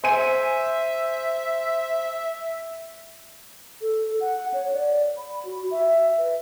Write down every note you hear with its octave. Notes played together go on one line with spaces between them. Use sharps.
C5 E5 G#5 D#7
A4
F#5
C#5
D5
B5
F#4
E5
B4